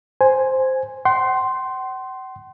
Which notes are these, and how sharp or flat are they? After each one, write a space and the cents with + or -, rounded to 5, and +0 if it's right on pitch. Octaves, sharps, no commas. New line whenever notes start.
C5 +0 G#5 +0
F#5 +45 C6 +0